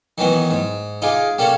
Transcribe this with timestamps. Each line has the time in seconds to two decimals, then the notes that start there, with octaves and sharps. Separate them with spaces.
0.18 D#3 E3 F#3 B3
0.50 G#2
1.02 D#4 F4 G#4 D6
1.38 G3 A#3 C#4 A4